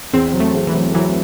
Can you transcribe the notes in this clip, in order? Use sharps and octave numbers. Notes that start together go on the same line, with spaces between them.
E2 C4
F#3
A3
E2
E3
F#3
E3 F#3